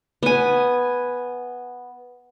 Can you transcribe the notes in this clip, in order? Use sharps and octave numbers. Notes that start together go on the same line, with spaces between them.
B3 G#5